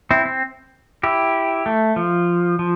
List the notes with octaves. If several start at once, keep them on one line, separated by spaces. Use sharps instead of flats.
C4 E4
C4
E4 G4
A3
F3
F3